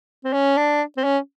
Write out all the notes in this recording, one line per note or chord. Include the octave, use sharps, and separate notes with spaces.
C4
C#4
D4
C4
C#4